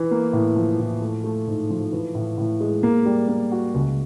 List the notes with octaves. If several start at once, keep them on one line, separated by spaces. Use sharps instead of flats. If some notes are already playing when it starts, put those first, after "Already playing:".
Already playing: E3
A#3
A2
F3
A2
A3
A3
G#2
F3
E3
A2
A2
G#3
A#3
G3
A#3
F#4
C#2